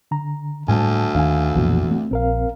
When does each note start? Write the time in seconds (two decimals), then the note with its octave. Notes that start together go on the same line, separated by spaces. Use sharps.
0.11 D3 A#5
0.68 D2 A2 G3 G#3 G#5 A5
1.15 D#2 D#3 D4 F5 G#5
1.55 B1 F2 A#2 E3 B3 F#4
1.91 A3 C4
2.11 A#1 C4 A#4 F5